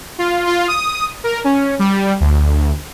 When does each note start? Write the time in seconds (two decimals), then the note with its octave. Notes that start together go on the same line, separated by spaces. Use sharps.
0.19 F4
0.47 F4
0.68 D#6
1.24 A#4
1.44 C#4
1.79 G3
2.20 D2